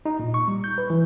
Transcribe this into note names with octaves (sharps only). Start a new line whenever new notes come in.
D#4
A#2
C#6
G3
G6
B4
E3